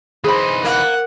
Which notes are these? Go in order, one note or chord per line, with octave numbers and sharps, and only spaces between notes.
E3 D#4 G#4 C5 B5
A#3 F#5